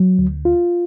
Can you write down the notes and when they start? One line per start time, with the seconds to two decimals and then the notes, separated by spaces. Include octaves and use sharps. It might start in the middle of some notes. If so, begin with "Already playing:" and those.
Already playing: F#3
0.18 D2
0.45 F4